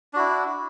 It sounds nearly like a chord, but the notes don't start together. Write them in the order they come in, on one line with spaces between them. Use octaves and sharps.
D4 F#4 E4